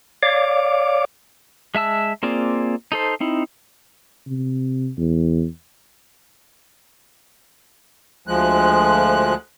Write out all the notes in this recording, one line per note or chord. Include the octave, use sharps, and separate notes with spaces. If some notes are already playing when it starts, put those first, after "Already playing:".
C#5 D5 F5 D6
G#3 E5 A5 E6
A#3 C4 F4 G#4 D5
D#4 A4 C5
C4 D#4 E4
C3
E2
D2 F3 G#3 F#6